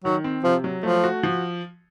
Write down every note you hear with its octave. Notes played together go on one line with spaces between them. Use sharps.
D#3 F#3
C4
C3 F3
F#3
F3 A3
F#4
F3